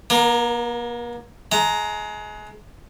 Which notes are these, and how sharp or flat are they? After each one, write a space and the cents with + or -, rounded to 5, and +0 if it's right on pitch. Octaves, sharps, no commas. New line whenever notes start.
A#3 +45 A#4 +0
G#3 +25 A#5 +0